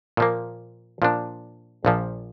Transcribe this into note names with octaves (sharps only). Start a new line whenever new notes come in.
A#2 F3 A#3
A#2 F3 D4
A#1 A#2 F3